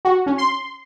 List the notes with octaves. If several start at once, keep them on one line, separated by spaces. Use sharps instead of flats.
F#4
C#4
C6